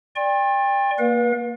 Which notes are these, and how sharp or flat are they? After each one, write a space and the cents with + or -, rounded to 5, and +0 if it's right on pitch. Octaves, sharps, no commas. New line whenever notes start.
D5 +0 G5 +30 C6 +45
A#3 +0 B4 -35 F5 +35